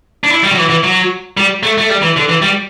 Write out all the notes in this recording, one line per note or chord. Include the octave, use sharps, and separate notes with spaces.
D4
E4
G3
F#3
E3
E3
F#3
G3
A3
A3
G3
E3
D3
E3
G3